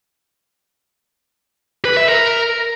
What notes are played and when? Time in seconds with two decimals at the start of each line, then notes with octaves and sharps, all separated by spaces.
1.85 B4
1.97 E5
2.09 A#4